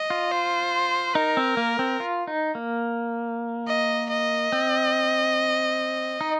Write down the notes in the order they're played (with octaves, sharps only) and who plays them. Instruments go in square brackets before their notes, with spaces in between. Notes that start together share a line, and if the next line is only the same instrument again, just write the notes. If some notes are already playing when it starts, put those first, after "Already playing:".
Already playing: [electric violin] D#5
[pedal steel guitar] F4
[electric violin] C5
[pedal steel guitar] D#4 [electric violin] A#4
[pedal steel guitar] C4
A#3
C4
F4
D#4
A#3
[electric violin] D#5
D#5
[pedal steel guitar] C4
D#4